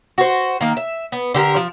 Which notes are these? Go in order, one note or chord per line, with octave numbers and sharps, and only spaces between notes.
F#4 C5
D#3 A#3
E5
B3
D3 G4 A#4
F3